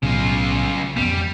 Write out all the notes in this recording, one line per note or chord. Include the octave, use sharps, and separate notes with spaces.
B1 A2 C#3 F4
F2 F3 G3 B3